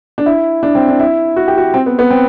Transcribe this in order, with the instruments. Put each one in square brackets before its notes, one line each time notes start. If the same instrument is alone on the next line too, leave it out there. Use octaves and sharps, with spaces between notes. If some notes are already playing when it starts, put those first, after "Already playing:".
[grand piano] D4
E4
D4
C4
D4
E4
F#4
G4
F#4
C4
B3
B3
C4